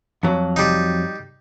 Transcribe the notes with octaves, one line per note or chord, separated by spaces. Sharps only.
F2 F#3
G3 D#4